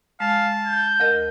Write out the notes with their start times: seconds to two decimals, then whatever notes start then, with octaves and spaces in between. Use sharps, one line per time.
0.20 G#3 F5 A5
0.67 G6
1.00 D2 A#4 D#5